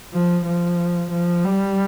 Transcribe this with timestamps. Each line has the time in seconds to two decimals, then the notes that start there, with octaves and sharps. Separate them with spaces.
0.13 F3
0.46 F3
1.10 F3
1.44 G3